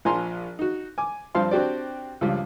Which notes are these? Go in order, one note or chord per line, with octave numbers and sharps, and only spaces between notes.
A#1 F3 G#5 A#5 C6
D#4 F#4
G#5 D6
G2 F3 C4 F5 A5 C6
C4 D4 F#4 G4 C5 D5
C#2 G2 F3 G3